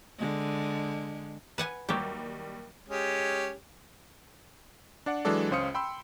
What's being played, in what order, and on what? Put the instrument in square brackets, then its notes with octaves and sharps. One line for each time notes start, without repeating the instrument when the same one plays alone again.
[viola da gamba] D3 G#3
[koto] B4 F#5 G#5
[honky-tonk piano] D#2 G3 [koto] F#3 G4
[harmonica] G#3 C#4 G4
[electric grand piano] D4 D5 F#5
E3 F#3 G#3 D4 A4 D5
C#2 C#4 C5 F5 D#6 C#7
G5 B5 C6 E6